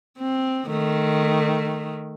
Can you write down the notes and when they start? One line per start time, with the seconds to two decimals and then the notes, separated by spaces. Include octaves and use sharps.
0.18 C4
0.68 D#3 A3